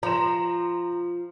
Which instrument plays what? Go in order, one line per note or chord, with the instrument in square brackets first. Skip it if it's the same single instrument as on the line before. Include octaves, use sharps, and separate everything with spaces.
[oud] F3 [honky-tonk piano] A#5 E7